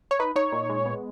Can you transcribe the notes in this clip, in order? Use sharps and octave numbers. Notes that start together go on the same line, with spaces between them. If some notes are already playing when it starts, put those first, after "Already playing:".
C#5
D#4 B4
D#4 C#5
A#2
G#3
B3